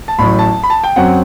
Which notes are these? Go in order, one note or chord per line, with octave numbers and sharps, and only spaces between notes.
A5
A1 A2 F#3 B5
A5
B5
A5
G5
F#2 F#3 C4 F#5